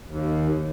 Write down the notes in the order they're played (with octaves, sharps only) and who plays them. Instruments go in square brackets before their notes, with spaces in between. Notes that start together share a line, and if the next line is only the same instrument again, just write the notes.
[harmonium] D#2